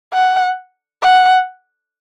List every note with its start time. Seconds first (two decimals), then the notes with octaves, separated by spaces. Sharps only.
0.14 F#5
1.03 F#5